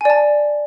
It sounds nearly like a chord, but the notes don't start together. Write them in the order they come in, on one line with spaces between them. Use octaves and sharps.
G#5 D5 A5